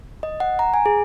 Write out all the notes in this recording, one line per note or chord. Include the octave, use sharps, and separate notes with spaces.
D#5
F#5
A#5
G#5
G#4